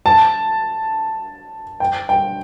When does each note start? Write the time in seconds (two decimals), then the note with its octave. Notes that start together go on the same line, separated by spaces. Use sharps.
0.06 A5
1.80 G5
2.09 G5